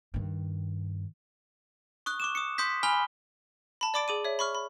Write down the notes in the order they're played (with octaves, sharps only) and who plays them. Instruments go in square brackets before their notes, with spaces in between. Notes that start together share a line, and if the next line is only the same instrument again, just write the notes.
[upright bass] G2 D#3
[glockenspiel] C#6 D#6 F#6
C#6 D6 E7
D#6 C#7
C6 D#6 G6 B6
G#5 B5 F6 G7
[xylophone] A5 B5
D5 B5 D6 A6 D7
G#4 D6 D#7
C#5 E5
B5 C#6 F6
B5